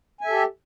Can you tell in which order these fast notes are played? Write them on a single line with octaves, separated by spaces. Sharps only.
G#5 E5 A4 G4